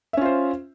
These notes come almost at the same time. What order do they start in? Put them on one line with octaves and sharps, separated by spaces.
E5 C#4 F4 C5